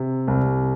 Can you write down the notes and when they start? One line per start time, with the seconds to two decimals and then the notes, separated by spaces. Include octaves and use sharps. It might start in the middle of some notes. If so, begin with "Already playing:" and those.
Already playing: C3
0.28 C2